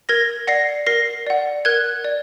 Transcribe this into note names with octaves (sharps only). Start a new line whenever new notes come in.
A#4 G#6 A#6
D5 F#5 A#6 C7
A#4 A#6 C7
D5 F#5
A#4 F#6 G#6
D5